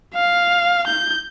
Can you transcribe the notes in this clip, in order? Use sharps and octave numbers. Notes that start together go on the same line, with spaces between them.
F5
G6